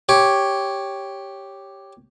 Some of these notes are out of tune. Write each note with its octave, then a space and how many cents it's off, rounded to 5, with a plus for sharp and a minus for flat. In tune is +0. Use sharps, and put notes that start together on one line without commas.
G4 +0 C#5 +0